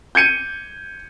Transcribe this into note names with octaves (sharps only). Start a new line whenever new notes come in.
G6 G#6 C#7 D#7